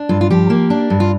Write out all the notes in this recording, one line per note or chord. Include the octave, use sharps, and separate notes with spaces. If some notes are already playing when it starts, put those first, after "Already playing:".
Already playing: D4
G2 F4
F4
F3 G4
A#3
D4
G2
F4